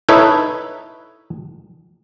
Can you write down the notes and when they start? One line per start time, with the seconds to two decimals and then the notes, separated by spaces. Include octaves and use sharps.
0.09 D#4 E4 A4 B4 C#5